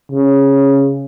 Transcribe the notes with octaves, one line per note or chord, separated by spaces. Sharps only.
C#3